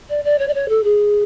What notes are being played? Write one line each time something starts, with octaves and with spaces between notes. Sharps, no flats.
D5
D5
C#5
D5
C#5
A4
G#4